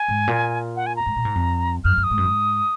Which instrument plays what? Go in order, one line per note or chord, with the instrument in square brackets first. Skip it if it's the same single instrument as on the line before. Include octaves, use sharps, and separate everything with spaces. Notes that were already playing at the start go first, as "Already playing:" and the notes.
Already playing: [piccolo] G#5
[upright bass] G#2
A#2
[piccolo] F#5
G#5
A#5
[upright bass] G#2
A#2
G#2
F2
[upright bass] F#2 [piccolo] F6
[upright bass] F#2
[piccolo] D#6
[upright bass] G#2
F#2
G#2